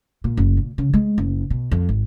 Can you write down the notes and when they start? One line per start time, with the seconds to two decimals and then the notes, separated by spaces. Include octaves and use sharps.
0.24 A#2
0.37 F#1
0.57 A#2
0.78 C#3
0.94 G#3
1.18 F#1
1.50 B2
1.71 F2
1.89 G#1